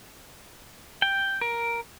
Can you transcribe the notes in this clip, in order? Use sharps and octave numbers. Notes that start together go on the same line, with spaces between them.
G5
A#4